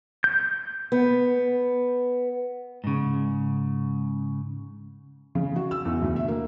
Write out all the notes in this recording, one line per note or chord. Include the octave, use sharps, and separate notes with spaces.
G6
B3
G#2 C#3
C#3
F#4
E6
E2
D2
E5
A#3